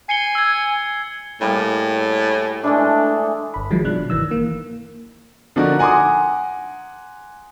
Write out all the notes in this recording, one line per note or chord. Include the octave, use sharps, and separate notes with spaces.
G#5 C7 C#7 G7
E6 G#6
A2 G3 A#3 G#4
E3 G#3 A3 D4
G1 B5
D#3 F3 F#3 G#3
B2 D4 F#6
G1 D#3 E3 E6
A#3
D3 F3 D4 D#4 F#4 A#4
F#5 G#5 A#5 C6 D6 D#6